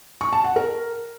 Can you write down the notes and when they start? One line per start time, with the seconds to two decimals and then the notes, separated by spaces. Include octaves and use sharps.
0.21 C#6
0.33 A5
0.44 F#5
0.56 A#4